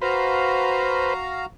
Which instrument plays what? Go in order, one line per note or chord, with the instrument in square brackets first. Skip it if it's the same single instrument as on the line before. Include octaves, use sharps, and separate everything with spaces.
[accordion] F#4 F5 A#5 [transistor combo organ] B4 C5